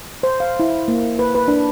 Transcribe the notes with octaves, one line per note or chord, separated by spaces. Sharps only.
C5
F5
E4
A#3
B4
B4
D4